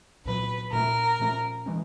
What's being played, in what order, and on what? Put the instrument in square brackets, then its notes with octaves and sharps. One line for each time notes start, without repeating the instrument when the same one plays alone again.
[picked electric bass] C2 A#2 F#3 [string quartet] B4
[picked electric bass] A#2 F3 A3 C#4 [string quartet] A#4
[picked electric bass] A#2 F3 A3 C#4
E3 G#3 C#4